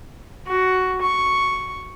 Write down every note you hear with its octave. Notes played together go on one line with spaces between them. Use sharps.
F#4
C#6